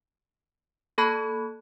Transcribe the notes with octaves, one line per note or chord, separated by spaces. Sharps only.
A#3 A4 A5 B5 F#6 G#6